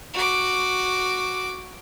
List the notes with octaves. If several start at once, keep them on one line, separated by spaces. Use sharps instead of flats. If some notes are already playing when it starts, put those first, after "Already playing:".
F#4 D6